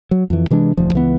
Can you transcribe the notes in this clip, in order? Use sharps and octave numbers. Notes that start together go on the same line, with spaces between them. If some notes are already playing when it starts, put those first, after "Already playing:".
F#3
F2 E3
C3 E3 G#3 D4
E1 D2 F3
C#2 E3 B3